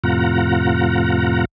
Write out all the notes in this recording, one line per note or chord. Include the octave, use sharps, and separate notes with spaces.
F2 A2 C3 F4 F#5 A#5